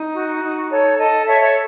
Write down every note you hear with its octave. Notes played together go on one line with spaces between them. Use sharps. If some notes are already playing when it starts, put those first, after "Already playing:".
Already playing: D#4
F#4
D#4
A4 C#5
A4 D#5
A4 C#5 E5
C#5